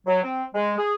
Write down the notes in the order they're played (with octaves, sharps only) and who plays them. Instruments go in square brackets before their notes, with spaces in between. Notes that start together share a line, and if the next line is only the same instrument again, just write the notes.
[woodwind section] F#3
C4
G#3
G#4